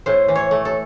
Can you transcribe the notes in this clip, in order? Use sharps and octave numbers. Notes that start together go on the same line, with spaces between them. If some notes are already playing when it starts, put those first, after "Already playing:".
A2 C5
E3
C#5
A3
A4